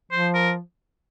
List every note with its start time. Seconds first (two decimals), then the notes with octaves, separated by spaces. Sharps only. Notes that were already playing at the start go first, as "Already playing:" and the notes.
0.12 F3 C5
0.34 A#4